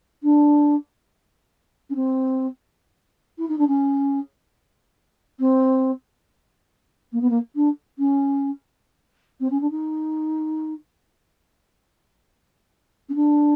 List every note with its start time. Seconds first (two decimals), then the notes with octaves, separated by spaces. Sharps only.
0.23 D4
1.90 C#4
1.95 C4
3.38 E4
3.48 D#4
3.58 D4
3.68 C#4
5.40 C4
7.12 A#3
7.21 B3
7.30 A#3
7.55 D4
7.98 C#4
9.40 C4
9.50 C#4
9.61 D4
9.70 D#4
13.09 C#4
13.15 D4